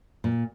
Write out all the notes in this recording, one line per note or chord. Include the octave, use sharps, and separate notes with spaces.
A#2